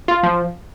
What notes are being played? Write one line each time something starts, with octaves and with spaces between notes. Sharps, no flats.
F4
F3